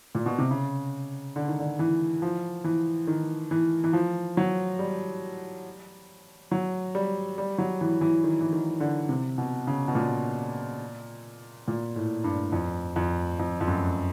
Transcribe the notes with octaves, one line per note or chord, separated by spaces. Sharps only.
A#2
B2
C3
C#3
D3
D#3
D3
E3
F3
E3
D#3
E3
E3
F3
F#3
G3
F#3
G3
G3
F#3
E3
E3
D#3
E3
D#3
D3
C3
B2
C#3
B2
A#2
A#2
A2
G2
F2
F2
F2
F2
F#2